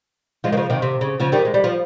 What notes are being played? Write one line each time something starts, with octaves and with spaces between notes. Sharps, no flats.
F3 G#3
D#3
C#3 F3
C3 D#3
C3
C#3
C#3 F3
D#3 G3
G#3
G3
F3